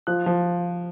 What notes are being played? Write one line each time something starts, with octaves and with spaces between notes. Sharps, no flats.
F3 F#6
F3